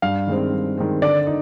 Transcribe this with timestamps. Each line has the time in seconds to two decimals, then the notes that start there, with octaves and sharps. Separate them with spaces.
0.02 G2 F5
0.27 D#3 G#3 C4
0.52 G2
0.77 D#3 G#3 C4
1.02 D3 D5
1.27 D#4